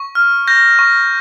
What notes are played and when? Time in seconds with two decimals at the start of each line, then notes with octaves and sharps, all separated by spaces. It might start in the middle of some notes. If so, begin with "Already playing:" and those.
Already playing: C#6
0.15 F6
0.47 G6 A#6
0.79 C#6